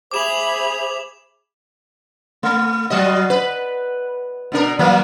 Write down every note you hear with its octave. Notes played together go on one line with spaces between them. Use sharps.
G#4 C5 E5 B5 D6 E7 F7
A3
F#3 F#4 D#5
B4
B2 D4 A#4
E3 F#3 A#3